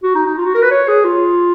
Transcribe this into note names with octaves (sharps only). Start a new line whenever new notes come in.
F#4
D#4
D#4
F4
F#4
A#4
B4
C#5
G#4
F4